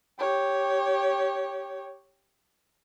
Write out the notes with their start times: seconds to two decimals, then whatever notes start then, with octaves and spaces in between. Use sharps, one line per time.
0.19 G4 C#5